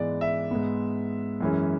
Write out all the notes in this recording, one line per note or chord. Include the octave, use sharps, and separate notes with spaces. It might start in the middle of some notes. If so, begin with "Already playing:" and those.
Already playing: G#2 E3 G#3 B3 D5
E5
G#2 G#3 B3
F#2 E3 G#3 C#4